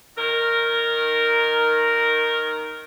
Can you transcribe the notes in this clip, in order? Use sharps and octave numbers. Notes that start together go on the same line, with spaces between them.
D#3 A#4